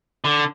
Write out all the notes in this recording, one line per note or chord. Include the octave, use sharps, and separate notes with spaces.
D3